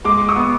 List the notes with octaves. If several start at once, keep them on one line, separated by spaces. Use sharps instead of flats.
G#3 C6 D6
C#6 D#6
B3